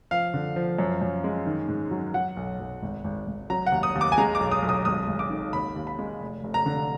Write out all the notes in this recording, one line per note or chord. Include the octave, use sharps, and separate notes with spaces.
F3 F5
D3
F3
F#2
F#2
G#3
D#3
G#2
F#3
F#3 F#5
B1
B1
G#1
G#1
G#1
F#3 A#5
F#5
D#2
D#6
D#2
D6
G#5
G#3 A#5
D6
B1
D#6
B1
D#6
G#1 D#6
G#1
D6
D#3
D#2 B5
D#2
B5
G#3
F1
F1
A#5
D3